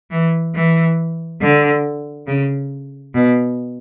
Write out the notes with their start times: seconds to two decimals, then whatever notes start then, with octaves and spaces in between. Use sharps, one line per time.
0.11 E3
0.54 E3
1.41 D3
2.27 C#3
3.14 B2